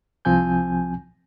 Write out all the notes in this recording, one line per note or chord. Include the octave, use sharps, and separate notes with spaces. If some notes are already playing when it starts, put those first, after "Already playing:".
C2 F3 C4 G#5 G6